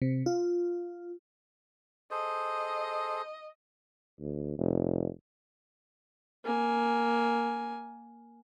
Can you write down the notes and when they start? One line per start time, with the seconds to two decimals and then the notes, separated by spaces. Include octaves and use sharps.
0.02 C3
0.26 F4
2.11 G#4 A4 C5 D#5
4.20 D2
4.58 F1
6.44 A#3 G#5